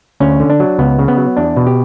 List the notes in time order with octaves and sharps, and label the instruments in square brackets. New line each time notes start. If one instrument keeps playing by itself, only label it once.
[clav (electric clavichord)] D2 C#4
D3
D4
F#3
C#2 B3
C#3
B3
F#3
E2 D4
B2
G4